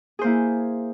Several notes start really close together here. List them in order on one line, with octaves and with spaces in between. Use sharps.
G#4 C5 A#3 E4